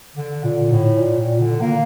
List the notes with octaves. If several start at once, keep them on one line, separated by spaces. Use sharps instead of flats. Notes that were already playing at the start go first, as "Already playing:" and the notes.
D3
A#2
A2
A#2
A#2
D3
A#3